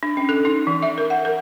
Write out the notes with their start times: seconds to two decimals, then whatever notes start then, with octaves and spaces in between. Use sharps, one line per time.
0.03 D4
0.17 C#4
0.29 A4
0.45 D#4
0.67 E3
0.82 E5
0.98 A#4
1.10 F#5
1.25 A#4